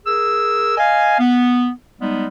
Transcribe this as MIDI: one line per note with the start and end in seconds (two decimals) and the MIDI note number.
0.05 0.76 68
0.05 0.76 70
0.05 0.76 88
0.78 1.17 75
0.78 1.17 77
0.78 1.17 80
1.20 1.70 59
2.01 2.26 55
2.01 2.26 56
2.01 2.26 59
2.01 2.26 63